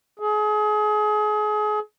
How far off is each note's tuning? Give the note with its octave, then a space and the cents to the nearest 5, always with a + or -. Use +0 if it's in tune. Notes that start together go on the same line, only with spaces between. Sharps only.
G#4 +30